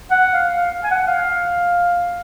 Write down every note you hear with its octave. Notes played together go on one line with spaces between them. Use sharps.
F#5
F5
F5
G#5
F#5
F5